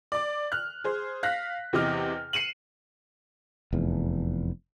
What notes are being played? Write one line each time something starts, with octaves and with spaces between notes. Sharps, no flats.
D5 D6
F6 F#6
G#4 C5
F5 F#6 A#6 B6
E2 C3 E3 D#5 D6 F6
C7 C#7 D#7 E7 F#7
F1 E2